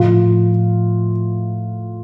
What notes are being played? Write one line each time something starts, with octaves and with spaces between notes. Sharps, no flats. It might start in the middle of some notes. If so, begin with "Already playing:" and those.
Already playing: A2 F3 F4